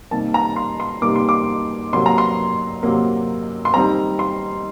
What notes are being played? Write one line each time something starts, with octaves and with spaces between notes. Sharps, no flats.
C3 D#3 G3 A#3 A5
A#5
C6
C6
C3 D#3 G3 A#3 D6
C6
D6
C3 F#3 A#3 C6
A#5
C6
C3 F#3 A#3
C6
D#3 G3 C4 A#5
C6